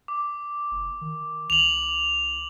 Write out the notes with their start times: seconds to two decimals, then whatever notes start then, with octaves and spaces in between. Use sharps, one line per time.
0.08 D6
0.71 F#1
1.01 D#3
1.50 C2 F7 F#7